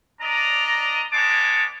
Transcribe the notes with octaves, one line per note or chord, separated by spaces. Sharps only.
D4 D5 D#5 A#5
G#3 B3 C#5 A5 D6